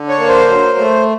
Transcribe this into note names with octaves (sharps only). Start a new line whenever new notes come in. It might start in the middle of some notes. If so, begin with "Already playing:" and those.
Already playing: D3
C#5
A#3
C5
F#3
A3